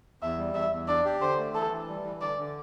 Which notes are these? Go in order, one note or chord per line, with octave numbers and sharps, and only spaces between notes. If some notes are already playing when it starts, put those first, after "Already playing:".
E2 E5
G3
E2 E5
E2
D4 D5
G4
D3 C5
A3
E3 A4
E3
G3
E3
D3 D5
D3